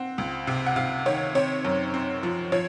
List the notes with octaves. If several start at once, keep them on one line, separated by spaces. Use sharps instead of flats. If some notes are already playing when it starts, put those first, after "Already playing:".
Already playing: C4 F#5
C#2
C3
F#5
C3 F5
D#3 C#5
C4 C#5
F#2
C4
F3
F3 C#5